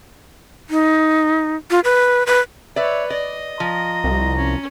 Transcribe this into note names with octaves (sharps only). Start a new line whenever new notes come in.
D#4
F4
B4
B4
B4 C#5 D5 E5
D5 D#5
F3 A#5
C2
C#4